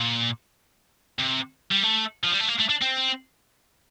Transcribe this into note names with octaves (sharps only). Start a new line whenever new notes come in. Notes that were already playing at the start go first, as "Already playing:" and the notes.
Already playing: A#2
C3
G3
A3
F3
G3
A3
A#3
A3
D4
C4